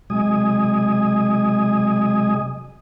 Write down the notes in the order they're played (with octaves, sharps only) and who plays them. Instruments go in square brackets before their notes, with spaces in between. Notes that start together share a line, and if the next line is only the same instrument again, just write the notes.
[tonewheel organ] C3 F#3 G#3 D#5 G#5 D#6